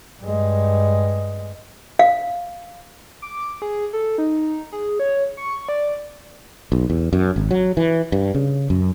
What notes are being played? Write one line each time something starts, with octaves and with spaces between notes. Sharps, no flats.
G2 G#3
F5
D6
G#4
A4
D#4
G#4
C#5
C#6
D5
B1
E2
F#2
G#1
F#3
E3
G2
C#3
F#2